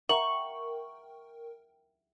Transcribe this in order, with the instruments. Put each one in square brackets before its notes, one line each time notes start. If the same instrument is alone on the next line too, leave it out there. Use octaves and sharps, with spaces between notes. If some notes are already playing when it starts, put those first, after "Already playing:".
[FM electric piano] A#4 G5 [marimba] E5 F#5 A#5 [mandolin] C#6 [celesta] F#7